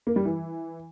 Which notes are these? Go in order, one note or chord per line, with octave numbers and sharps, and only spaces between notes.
A#3
G3
E3